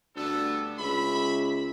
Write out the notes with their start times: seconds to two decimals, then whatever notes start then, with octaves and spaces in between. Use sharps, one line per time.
0.16 D2 G3 B3 A4
0.78 C#2 E5 B5